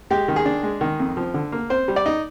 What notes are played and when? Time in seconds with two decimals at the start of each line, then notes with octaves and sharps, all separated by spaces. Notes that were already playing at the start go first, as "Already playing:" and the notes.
0.11 G#3 G4
0.28 D#3
0.36 G#4
0.46 D4
0.63 G#3
0.81 D#3
1.00 F2
1.17 F3
1.34 D3
1.52 A#3
1.70 C4 C5
1.88 G3
1.96 D5
2.06 D#4